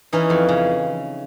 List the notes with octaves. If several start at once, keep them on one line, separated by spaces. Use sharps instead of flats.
E3 C#4 D#4
F2
C#3